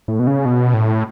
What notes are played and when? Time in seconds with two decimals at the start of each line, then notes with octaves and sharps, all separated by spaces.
0.08 A2
0.19 B2
0.27 C#3
0.45 B2
0.74 A2